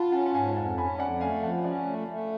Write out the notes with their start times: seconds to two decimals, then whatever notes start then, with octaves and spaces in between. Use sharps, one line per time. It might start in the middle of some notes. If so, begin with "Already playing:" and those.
Already playing: F4 F5 F#5 A5 B5
0.12 C#4 F#5 A5
0.26 F#5
0.34 G#2 F5 G#5
0.55 F2 F#5 A5
0.78 C#4 G#5 B5
0.99 F2 D5 F#5
1.20 A3 F5 G#5
1.42 F3 F#5 A5
1.64 C#4 D5 F#5
1.86 A3
2.08 A3